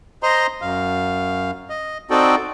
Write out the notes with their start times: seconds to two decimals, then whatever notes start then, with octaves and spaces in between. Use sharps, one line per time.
0.23 C5 D#5 A#5 C6
0.62 F#2 F5
1.70 D#5
2.10 C4 D#4 F#4 A4 D5 G5